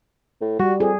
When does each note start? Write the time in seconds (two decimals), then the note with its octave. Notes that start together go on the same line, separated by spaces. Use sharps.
0.41 A2
0.59 G3 F#4
0.80 F2 G#4